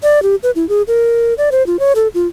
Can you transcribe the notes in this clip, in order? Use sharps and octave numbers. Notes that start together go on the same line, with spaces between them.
D5
G4
B4
E4
G#4
A#4
D5
C5
F4
C#5
A4
F4